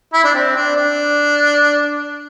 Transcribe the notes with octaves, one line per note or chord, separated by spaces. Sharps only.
E4
D4
C4
D4
D4